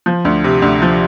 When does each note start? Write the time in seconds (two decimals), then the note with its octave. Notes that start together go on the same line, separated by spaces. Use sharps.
0.06 F3
0.25 D2
0.44 C3
0.62 D2
0.82 F3